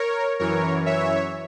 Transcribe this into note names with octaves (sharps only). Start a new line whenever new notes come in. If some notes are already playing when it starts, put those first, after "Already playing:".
Already playing: A#4 C#5
F#2 E3 A#4 C#5
C#5 E5